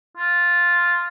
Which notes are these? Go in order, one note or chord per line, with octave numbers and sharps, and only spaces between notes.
F4